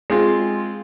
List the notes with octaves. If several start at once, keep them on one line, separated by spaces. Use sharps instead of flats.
G#3 C4 F4